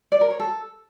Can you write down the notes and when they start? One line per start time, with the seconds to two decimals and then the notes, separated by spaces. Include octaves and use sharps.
0.12 D5
0.21 A#4
0.30 C#5
0.40 A4